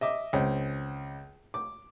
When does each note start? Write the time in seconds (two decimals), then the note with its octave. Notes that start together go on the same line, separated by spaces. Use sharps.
0.01 D#5 E5 D6
0.33 C#2 C4
1.54 D6